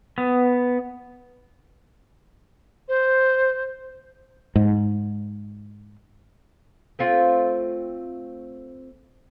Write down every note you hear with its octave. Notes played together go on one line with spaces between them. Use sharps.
B3
C5
G#2
A3 C4 F4